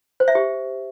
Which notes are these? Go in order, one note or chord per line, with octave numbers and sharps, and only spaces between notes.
C5
E5
G4